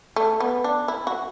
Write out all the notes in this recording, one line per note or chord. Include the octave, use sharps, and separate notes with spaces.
A3
B3
D4
E4
F#4